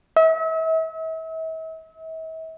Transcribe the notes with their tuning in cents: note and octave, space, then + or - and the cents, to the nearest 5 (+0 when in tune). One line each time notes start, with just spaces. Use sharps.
E5 -40